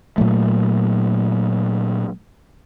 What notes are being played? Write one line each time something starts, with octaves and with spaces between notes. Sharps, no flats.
A#2 F#3 A3